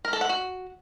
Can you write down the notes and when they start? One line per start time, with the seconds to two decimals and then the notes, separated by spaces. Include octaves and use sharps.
0.05 A#4
0.13 A4
0.21 F#5
0.29 F#4